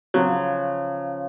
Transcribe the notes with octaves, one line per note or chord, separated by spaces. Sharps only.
C#3 F3 F#3